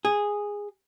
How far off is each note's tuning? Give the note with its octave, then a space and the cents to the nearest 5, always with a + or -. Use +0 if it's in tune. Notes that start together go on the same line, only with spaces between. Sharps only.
G#4 -10